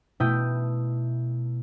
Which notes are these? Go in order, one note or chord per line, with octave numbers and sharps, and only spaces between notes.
B2 A3 E4 G5 D#6 G6